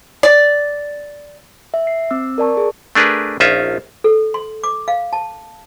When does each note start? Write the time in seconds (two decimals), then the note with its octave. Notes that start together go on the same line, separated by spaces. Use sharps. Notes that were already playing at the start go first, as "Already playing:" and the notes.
0.23 D5
1.74 E5
1.87 C7
2.11 C4 E6
2.38 A#4 D5 A5 C#6
2.57 G#4
2.95 A3 D4 G#4 A#4 B4
3.40 A#1 C#4 D#4 F4 E5
4.04 A4
4.34 C6
4.64 D6
4.88 F5
5.13 A5